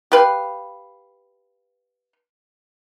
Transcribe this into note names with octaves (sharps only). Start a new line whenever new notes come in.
G4 B4 F5